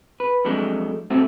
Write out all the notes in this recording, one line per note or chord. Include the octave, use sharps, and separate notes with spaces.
B4
F2 F#3 G#3 A3 D4
A2 C3 A3 C4 F#4